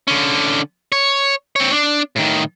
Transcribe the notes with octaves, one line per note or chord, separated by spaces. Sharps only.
D3 C#4
C#5
C4 C#5
D4
A2 D#3